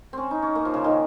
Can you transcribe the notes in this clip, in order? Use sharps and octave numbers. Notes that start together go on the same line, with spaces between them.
C4 C#4
D#4
C#4
A#3
F3
C#3
D#3